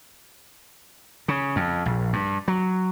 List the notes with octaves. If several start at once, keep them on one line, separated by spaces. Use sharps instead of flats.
C#3
F2
A#1
G2
F#3